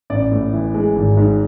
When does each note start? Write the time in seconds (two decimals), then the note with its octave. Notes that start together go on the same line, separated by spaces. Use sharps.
0.10 A1 D5
0.32 A2
0.53 E3
0.74 G#3
0.96 G#1
1.17 G#2